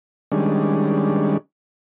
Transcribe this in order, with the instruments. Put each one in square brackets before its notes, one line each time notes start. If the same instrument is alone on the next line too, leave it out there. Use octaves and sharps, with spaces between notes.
[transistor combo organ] D#3 G3 G#3 C#4 D4